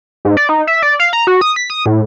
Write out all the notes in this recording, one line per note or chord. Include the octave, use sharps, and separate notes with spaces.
G#2
D5
D#4
E5
D5
F5
A#5
F#4
D#6
B6
D#6
A2